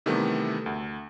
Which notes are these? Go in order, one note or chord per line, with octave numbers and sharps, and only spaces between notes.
C3 D#3 E3 G3 A3 B3
D2